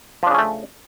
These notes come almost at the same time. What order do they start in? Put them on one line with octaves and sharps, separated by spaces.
F3 D4 C#3 C#4 A3